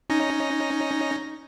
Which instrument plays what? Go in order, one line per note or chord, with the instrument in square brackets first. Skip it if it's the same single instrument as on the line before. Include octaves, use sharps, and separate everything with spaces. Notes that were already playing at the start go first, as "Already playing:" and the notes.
[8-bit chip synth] C#4 D#4 A#6